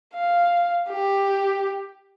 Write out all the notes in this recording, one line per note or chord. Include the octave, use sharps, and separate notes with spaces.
F5
G4